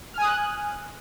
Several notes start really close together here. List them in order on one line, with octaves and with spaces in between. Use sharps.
F6 G#5 D#6 F#6